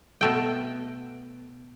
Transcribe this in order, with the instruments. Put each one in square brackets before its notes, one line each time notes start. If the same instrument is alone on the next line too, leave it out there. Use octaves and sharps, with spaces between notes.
[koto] B2 A3 G5